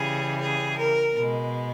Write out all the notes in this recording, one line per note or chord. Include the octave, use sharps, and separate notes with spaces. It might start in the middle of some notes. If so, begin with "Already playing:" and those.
Already playing: C#3 E3 G3 G#4
G#4
A#4
B2 G#3